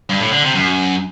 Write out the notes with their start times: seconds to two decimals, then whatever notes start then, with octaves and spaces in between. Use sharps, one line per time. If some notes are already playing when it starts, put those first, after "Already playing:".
0.10 G2
0.21 A2
0.32 D3
0.43 C3
0.55 F#2